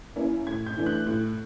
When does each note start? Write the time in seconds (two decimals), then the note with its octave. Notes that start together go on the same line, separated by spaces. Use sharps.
0.16 A#3 C#4 E4
0.47 A2 G#6
0.66 G6
0.77 E3 A3 D4
0.86 F#6
1.07 A2